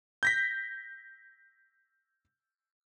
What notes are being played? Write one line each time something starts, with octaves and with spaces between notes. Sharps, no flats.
G6 A#6 B6